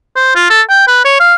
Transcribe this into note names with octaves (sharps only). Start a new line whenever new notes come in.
C5
F4
A4
G5
B4
C#5
F5